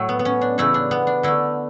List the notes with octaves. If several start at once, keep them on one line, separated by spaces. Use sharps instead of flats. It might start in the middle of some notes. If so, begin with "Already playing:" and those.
Already playing: A2 F#3 A3
B3
B3
C#4
D4
C#3 E3 A3 E4
D4
B3
D4
D3 A3 E4